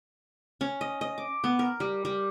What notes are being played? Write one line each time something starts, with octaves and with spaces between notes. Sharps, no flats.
C#4
D#5
D#5
D6
B3
A#4
G3
G3